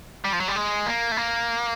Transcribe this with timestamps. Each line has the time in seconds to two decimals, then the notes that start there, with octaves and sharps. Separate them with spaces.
0.24 G3
0.33 F3
0.40 F#3
0.48 G3
0.56 G#3
0.86 A#3
1.12 A3
1.17 A#3